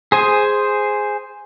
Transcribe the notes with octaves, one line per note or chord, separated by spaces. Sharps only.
G#4 C5 G#5